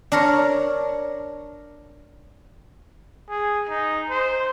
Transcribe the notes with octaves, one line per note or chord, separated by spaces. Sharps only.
D4 A#4 C#5
G#4
D#4
C5